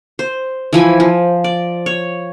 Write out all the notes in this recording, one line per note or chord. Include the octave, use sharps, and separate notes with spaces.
C5
E3 F3 E4 G#5
F3
D5
C#5